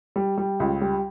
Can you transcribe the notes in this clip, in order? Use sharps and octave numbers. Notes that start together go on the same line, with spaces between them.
G3
G3
C#2
G3